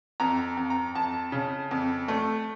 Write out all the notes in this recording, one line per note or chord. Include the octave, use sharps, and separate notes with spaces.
F2 A#5
F2
A#5
F2 A5
C#3
F2
A3